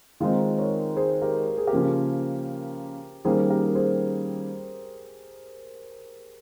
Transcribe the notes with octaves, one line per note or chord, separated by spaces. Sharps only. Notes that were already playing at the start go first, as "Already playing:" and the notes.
D#3 G#3 C4 D#4 F4 G#4
A#4 C#5
G#4 C5
G4 A#4
A#4
G#4
G4 A#4
C#3 F3 A#3 C#4
D#3 G3 A#3 C#4 G#4 C5
G4 A#4
A#4
G#4 C5